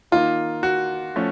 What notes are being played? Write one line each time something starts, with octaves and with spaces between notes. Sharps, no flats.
D#3 A#3 D#4 F4
F#4
F3 A3 C#4